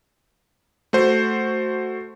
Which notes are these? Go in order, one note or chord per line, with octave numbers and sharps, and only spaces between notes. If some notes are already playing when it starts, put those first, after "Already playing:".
A3 F#4 C5